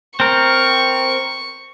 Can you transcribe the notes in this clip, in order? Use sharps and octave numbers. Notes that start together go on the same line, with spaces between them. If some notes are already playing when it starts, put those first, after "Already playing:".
C4 A#4 C#6